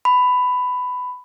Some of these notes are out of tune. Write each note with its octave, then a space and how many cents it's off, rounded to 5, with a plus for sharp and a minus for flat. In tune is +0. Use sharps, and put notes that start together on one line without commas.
B5 +15